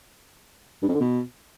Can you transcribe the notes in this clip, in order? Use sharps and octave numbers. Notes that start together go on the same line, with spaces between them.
G2
F2
D3
B2